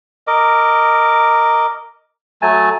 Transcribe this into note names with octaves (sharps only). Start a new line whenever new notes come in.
A#4 D#5 D6
F#3 A3 G#5 A5